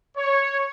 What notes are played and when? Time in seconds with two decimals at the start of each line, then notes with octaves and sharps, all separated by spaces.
0.16 C#5